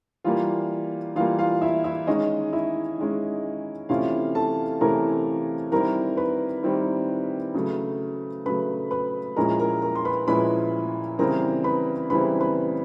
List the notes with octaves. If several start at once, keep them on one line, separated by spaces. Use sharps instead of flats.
E3 G3 A#3 F4 F5
E3 G3 A#3 F4 F5
F4 F5
E4 E5
E4 E5
D#3 G#3 C#4 D#4 D#5
E4 E5
D#3 G#3 C#4
C3 E3 A3 C#4 E4 F4 F5
A4 A5
C3 E3 A3 C#4 E4 A#4 A#5
D#3 G3 C4 E4 A#4 A#5
B4 B5
D#3 G3 C4 E4
C#3 F#3 A3
C#3 F#3 A3 B4 B5
B4 B5
A#2 F3 G#3 C#4 E4 A#4 A#5
A#4 A#5
A#4 A#5
C6
B4 B5
A#2 F3 G#3 C#4 E4 B4 B5
C#3 E3 G3 C4 E4 A#4 A#5
B4 B5
C#3 E3 G3 C4 E4 B4 B5
B4 B5